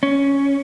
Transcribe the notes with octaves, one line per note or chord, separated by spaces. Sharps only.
C#4